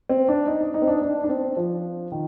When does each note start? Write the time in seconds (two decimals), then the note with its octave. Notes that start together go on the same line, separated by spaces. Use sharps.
0.09 C4
0.28 D4
0.47 D#4
0.60 D4
0.74 D#4
0.82 C4
0.87 D4
1.02 D4
1.24 D4
1.29 C4
1.57 F3
2.12 D#3